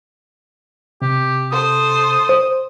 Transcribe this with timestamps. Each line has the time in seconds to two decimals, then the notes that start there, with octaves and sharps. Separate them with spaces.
1.02 C3 G4
1.51 A4 C5 D#6
2.29 C5